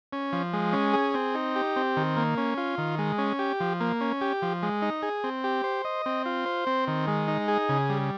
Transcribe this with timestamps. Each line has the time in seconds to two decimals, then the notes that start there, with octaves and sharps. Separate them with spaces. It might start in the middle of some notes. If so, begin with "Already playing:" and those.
0.13 C#4
0.33 F3
0.53 G#3
0.73 C#4
0.93 G#4
1.14 C4
1.35 D#4
1.56 G4
1.76 C4
1.97 D#3
2.16 A#3
2.37 C#4
2.57 F4
2.78 D#3
2.98 G#3
3.18 C#4
3.39 G4
3.60 F3
3.80 A#3
4.01 C#4
4.21 G4
4.42 F3
4.63 G#3
4.82 D#4
5.02 G#4
5.24 C4
5.44 G4
5.64 C5
5.85 D#5
6.06 C4
6.26 F4
6.46 C5
6.67 C4
6.88 D#3
7.08 G#3
7.28 D#4
7.48 G#4
7.69 C#3
7.89 G3